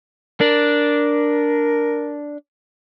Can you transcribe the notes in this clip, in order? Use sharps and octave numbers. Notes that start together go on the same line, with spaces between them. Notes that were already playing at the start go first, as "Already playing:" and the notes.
D4 A#4